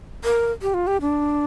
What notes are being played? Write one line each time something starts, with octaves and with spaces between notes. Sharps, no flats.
A#4
G4
F4
G4
D4